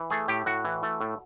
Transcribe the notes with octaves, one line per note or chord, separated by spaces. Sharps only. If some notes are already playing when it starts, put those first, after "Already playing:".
Already playing: E3
A3 G#4
A2 G4
A2 F#4
E3
A3
A2